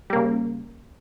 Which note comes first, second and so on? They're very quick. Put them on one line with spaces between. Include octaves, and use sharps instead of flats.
G3 A#3 C#3